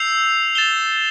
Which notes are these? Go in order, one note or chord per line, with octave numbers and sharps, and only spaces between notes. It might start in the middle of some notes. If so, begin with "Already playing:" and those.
Already playing: E6 G6 C7 F7
A6 E7 G7